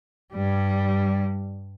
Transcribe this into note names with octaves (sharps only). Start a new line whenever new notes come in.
G2 G3